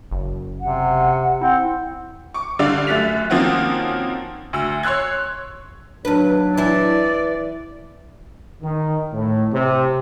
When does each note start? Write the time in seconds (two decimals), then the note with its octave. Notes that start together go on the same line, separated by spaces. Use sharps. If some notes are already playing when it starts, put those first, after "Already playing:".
0.11 F#1
0.60 C3 F#5
1.41 C4 E4 F#5
2.34 C#6 D6
2.59 D3 G3 D5 F5
2.87 F#2 A3 F#6 A6 B6 F7
3.30 D#3 F3 A#3 C4 C#4 F#4
4.53 D2 E6
4.83 C#5 C6 E6 F#6 G#6
6.05 D#2 F#3 D4 B4
6.57 E3 E4 D5
8.63 D#3
9.12 A2
9.52 C3